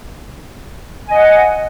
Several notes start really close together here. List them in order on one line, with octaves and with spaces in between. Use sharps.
G#5 D#5 F#5